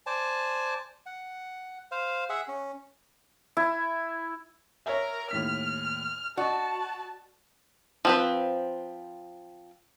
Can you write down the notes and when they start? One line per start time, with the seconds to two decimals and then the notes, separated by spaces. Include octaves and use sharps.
0.06 C5 D5 G#5 A5
1.06 F#5
1.91 C5 F5
2.29 G#4 E5 F#5
2.48 C#4
3.57 E4
4.86 A#4 C#5 E5
5.31 D#2 A2 F6 B6
6.37 F#4 D5 D#5 A5
8.05 F3 C4 B4